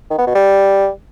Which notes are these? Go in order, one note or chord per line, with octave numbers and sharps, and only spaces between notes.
D#3
B3
B2
G3